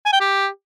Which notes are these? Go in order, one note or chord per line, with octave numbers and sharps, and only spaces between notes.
G#5
G5
G4